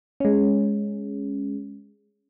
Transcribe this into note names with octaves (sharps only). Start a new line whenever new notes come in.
G#3 C#4